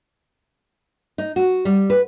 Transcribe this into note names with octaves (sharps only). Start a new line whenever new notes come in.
D#4
F#4
G3
B4